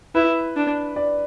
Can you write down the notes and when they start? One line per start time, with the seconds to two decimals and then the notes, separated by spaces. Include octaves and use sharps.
0.15 E4 B4
0.56 D4
0.96 D5